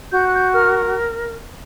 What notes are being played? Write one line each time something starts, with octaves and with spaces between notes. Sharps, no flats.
F#4 G6
F#6
G6
A#4 F6